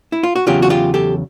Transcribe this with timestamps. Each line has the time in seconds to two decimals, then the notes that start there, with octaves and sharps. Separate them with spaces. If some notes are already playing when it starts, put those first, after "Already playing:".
0.12 E4
0.23 F4
0.36 F#4
0.46 E2 C#3 F#3 F4 G4
0.62 F#4
0.70 F4 G4
0.94 G4 A4